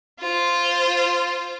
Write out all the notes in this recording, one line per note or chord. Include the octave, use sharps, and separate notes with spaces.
F4 C5